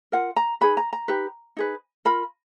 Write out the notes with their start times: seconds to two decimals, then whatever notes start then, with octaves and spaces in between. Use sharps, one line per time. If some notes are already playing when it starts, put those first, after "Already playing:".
0.12 F4 A#4 F#5
0.36 A#5
0.61 D#4 G#4 B4 B5
0.77 A#5
0.93 A#5
1.08 D#4 G4 B4
1.57 D#4 G#4 B4
2.05 F4 A#4 B5